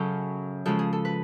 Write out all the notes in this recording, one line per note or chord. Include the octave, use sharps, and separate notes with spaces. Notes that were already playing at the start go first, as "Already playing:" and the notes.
Already playing: F#2 C#3 F#3 F#4 A4
C#3 F3 G#3 C#4 A4
G#4
A4
B4